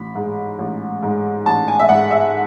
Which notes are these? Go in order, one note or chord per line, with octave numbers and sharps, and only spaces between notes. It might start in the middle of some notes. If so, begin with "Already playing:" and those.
Already playing: A1 B5
G#2 G#3
A1
G#2 G#3
A1 A5
G#5
E5
G#2 G#3 F#5
E5